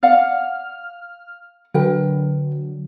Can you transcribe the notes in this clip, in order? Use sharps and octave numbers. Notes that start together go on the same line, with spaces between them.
D5 F5 F#5 F6
D3 F#3 A#4 B4 G5